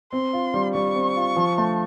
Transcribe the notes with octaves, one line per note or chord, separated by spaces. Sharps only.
C4 C6
F4
G3
G3 C#6
C4
F4
F3
A3